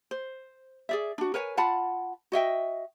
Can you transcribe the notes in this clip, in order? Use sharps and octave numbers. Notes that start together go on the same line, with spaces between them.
C5
G#4 D5 E5
D4 F#4
A#4 B4 C#5 G#5
F4 F#5 A5 B5
F#4 D#5 E5 G5